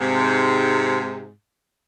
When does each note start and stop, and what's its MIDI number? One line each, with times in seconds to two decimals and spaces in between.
0.01 1.31 44
0.01 1.31 48